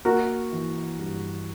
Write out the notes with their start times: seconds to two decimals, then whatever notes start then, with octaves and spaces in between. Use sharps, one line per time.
0.05 A#3 F#4 A#4
0.52 E3
0.99 G2